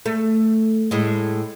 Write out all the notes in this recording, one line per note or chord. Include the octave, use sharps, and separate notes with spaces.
A3
A2 G#3